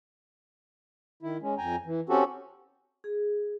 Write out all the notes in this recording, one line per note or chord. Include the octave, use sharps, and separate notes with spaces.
D#3 E4
G#3 C#4
F2 G5 G#5 A#5
E3
C4 C#4 F#4 G4 A4
G#4